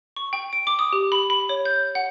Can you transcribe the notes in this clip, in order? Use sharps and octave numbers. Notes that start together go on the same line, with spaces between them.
C#6
G5
D7
D6
D#6
G4
B5
B5
C#5
G6
F#5